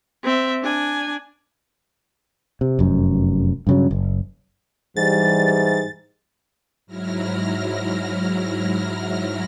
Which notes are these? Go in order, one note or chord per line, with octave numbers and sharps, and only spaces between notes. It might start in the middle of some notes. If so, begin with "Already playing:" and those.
C4 E5
D4 G#5
C3
F1 F#2
G2 C#3 F#3
F#1
G#2 E3 G3 A6
G#2 F#3 E4 F6 A#6